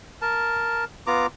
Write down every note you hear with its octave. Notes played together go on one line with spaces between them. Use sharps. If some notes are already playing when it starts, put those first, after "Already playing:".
A#4 A5
B3 F4 A#5 D6